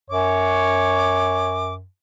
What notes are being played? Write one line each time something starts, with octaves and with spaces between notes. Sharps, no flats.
F#2 C#5 D6